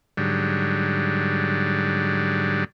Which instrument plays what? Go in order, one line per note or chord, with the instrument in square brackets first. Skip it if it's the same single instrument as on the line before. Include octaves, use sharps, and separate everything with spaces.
[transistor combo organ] G#2 D3 F#3 G3